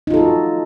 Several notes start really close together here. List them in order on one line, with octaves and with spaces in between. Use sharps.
D#4 F4 A4 F#4